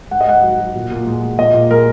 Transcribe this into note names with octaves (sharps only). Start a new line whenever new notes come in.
G#2 F#5
D#5
G#2 F#5
F#3
F#3
A#2
A#2
G#3
G#3
A#2 D#5
A#2
G#3 A#4